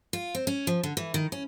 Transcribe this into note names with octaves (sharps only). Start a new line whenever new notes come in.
F4
C4
C#4
F3
D3
E3
D#3
C#4